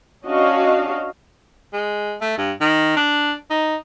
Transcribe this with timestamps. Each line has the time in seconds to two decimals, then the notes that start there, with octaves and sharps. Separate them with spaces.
0.25 C#4 D4 F#4 D#5 F5
1.73 G#3
2.21 A3
2.38 G2
2.61 D#3
2.96 D4
3.50 D#4